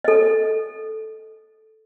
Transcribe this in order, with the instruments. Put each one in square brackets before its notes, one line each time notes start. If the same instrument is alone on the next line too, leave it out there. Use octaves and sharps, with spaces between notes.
[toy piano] A4 D#5